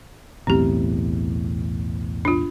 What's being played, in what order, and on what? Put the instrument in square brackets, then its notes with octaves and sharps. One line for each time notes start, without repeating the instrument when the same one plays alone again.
[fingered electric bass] B1 E2 A2 [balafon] C4 G4
[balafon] D4 F4